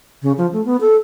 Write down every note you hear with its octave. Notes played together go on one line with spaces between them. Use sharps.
C#3
F3
A3
B3
A4